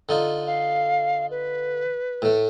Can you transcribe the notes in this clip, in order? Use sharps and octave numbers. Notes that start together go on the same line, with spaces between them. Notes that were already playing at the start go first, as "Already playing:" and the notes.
D3 D#4 F4
F5
B4
A2 A3